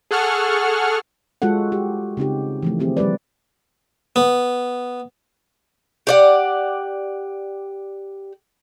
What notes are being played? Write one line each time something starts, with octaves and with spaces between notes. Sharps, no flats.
G#4 A4 F#5 C#6 F6
G#3 F4 F#4 A4 F#5
G4
C#3 C4 D#4 G4
E3 F3 A3
D#3 C4 G4 G#4
F3 G3 G4 B4 D5
B3
G4 D5 F#5